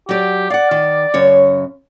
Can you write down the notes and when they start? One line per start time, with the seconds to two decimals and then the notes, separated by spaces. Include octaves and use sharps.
0.09 F#3 G4 D5
0.50 D5 F5 F#5
0.71 D#3
1.14 F#2 C#3 C#5